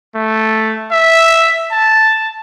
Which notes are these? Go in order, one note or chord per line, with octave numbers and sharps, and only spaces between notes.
A3
E5
A5